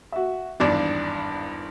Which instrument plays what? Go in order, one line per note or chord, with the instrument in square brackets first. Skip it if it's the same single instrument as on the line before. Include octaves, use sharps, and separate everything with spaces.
[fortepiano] F#4 E5
[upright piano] G#1 E2 G2 [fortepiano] D4